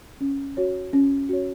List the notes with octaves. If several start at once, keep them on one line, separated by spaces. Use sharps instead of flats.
C#4
F#4 C#5
C#4
F#4 C#5